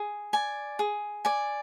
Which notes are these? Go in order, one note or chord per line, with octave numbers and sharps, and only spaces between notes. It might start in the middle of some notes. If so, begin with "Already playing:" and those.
Already playing: G#4
D5 G#5
G#4
D5 G#5